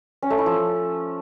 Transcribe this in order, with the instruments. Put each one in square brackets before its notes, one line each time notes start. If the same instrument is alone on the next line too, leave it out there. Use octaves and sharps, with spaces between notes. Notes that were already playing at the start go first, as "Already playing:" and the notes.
[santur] C#4
A3
E4
F3